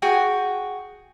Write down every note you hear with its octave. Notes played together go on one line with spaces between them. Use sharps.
F#4 G#4 G5